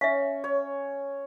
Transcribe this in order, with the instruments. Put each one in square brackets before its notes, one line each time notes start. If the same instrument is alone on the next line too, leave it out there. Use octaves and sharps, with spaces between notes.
[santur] C#4 [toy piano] E5 F5
[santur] C#5